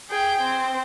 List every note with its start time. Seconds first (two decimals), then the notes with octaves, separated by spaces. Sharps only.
0.10 G#4 G5
0.41 C4